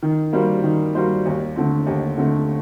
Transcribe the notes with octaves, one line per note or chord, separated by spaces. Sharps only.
D#3
G3 A#3 F#4 C5
D#3
G3 A#3 F#4 C5
D#2
D3 A3 C4
D#2
D3 A3 C4